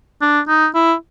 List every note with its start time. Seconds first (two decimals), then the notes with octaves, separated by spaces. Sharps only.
0.22 D4
0.48 D#4
0.75 E4